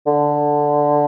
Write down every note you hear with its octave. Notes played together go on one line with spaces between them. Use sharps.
D3